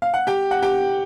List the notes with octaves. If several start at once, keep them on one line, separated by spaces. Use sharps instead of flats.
F5
F#5
G4 G5
F#5
G4 G5